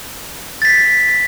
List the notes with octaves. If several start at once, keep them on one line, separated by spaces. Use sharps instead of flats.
A6 B6